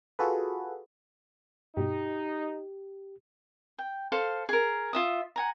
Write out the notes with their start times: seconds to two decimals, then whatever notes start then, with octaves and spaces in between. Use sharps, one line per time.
0.19 F4 F#4 G#4 A4 B4
1.77 G2 B2 D#4 G4
3.78 G5
4.12 A4 C5 F5
4.49 G#4 A#4
4.93 F4 E5 D#6
5.36 F#5 G#5 A#5